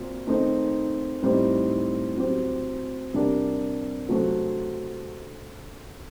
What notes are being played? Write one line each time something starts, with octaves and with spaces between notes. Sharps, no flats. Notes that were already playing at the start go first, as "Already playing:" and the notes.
Already playing: A#2 F#3 C4
D#3 A3 C4 D#4
A2 G3 C4 D#4
F#3 C4 G4
C3 G3 D4 G4 A#4
C3 F#3 A3 C4 F#4